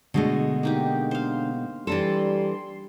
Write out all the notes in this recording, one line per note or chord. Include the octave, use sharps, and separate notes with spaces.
B2 D3 G#3 A3
A#3 D#4 G4
C5 F5
E3 G3 D4 A4 A5 A#5 C6